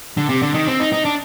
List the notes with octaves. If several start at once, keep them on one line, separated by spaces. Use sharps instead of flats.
D3
C3
D3
D#3
C4
D#4
D#4
D4